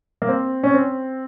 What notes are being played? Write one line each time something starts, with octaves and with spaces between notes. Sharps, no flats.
A#3
C4
C#4
C4